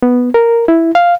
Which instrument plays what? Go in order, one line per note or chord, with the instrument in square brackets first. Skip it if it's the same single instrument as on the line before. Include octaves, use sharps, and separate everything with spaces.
[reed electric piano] B3
A#4
E4
F5